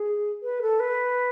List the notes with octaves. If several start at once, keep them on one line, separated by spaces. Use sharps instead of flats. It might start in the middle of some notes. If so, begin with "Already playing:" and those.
Already playing: G#4
B4
A4
B4